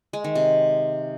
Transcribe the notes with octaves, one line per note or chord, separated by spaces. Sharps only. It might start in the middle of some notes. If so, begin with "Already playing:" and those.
G#3
D#3
C3